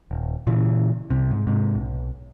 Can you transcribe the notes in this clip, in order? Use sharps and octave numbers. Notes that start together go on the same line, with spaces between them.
D#1
A#2 C#3 E3
C2 C3
G#2
G#2 C3
B1